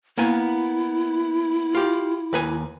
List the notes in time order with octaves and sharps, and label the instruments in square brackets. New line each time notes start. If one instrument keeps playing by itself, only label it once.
[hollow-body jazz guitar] A#3 B3 G#5 [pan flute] E4
[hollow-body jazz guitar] F4 G4
D#2 B4 G#5